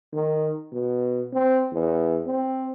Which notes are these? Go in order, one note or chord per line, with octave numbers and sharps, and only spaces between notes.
D#3
B2
C4
E2
C4